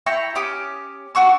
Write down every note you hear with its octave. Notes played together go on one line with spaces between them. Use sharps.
E4 G5 A#5 C#6
C#4 G4 D6 D#6
D4 F#4 C#6 E6